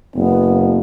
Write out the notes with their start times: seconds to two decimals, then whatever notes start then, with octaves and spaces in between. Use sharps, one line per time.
0.15 F#1 B3